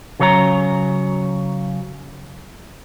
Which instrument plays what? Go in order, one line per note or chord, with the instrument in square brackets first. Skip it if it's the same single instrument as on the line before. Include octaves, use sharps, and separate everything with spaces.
[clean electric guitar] C#3 F#3 C#5 D#5 A#5